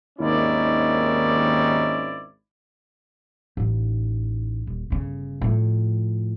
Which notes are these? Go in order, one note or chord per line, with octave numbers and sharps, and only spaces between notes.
G#1 D#2 C#4 D#4 E4 D5
A1 D#4
D#1
G1 C#3
A2 F3